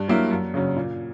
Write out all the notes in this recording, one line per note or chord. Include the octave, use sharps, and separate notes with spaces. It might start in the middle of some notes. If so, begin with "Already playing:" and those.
Already playing: G2
F#3 A#3 E4
F#2
C#3 F#3 C#4
A#2